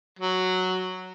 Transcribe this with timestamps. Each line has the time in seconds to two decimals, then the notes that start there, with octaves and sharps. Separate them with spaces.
0.19 F#3